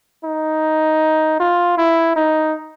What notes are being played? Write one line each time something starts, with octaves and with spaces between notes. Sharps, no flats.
D#4
F4
E4
D#4